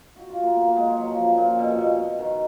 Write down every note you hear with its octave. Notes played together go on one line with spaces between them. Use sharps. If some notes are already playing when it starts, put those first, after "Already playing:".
F#4
F4
A#3
B3
A#3
G#3
G#3
F#3
F3
C#3
A#2
B2
A#2
B2
B2
D#3